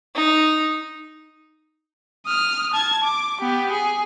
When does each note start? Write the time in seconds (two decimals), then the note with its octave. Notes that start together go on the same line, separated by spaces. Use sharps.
0.15 D#4
2.26 D#6 F6
2.73 A5 G#6
3.04 D6
3.41 B3 G4
3.72 G#4